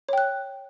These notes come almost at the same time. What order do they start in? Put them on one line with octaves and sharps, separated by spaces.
C#5 G5 F#6